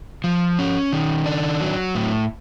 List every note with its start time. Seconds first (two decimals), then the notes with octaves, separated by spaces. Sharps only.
0.24 F3
0.59 C#4
0.93 D#3
1.26 D4
1.61 F#3
1.95 A2